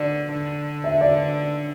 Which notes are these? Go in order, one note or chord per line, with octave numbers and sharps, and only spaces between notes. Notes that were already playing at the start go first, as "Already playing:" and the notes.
Already playing: D3 D5
D3
E5
D5